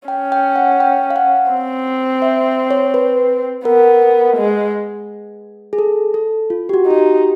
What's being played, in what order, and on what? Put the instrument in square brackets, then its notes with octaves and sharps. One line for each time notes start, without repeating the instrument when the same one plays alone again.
[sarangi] C#4 [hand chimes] G5
[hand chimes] G5
F#5
G5
F5
F#5
[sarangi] C4
[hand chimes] E5
C#5
B4
[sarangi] B3 [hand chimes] A#4
[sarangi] G#3
[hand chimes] G#4
A4
A4
F4
G4
F#4
[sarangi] D#4 [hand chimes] F#4
[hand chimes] G4